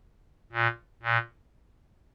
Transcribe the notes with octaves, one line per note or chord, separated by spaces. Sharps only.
A#2
A#2